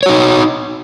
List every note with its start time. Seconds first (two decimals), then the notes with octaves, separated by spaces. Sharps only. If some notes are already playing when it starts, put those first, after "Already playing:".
0.03 C#5
0.06 F#4
0.09 D#4